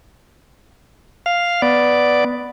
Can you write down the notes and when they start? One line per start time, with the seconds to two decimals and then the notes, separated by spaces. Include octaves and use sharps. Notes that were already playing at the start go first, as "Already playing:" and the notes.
1.26 F5
1.62 B3 D5